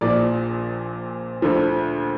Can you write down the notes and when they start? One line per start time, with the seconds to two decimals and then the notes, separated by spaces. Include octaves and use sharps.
0.01 A#1 A#2 F3 D5
1.42 D2 D3 F3